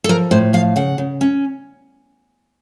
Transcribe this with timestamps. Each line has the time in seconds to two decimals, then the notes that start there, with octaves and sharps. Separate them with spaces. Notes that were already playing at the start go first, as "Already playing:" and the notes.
0.04 A4
0.09 F3 A#4
0.31 A2 C5
0.53 F3 F5
0.76 C#3 F#5
0.98 C#3
1.21 C#4